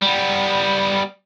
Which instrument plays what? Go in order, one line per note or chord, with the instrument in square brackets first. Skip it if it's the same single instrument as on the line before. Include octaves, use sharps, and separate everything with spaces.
[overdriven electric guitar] G3 B3